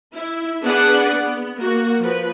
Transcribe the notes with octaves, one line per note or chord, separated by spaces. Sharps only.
E4
B3 D4 G#4 B4 D5 F#5
B3
A#3 F#4
F3 B4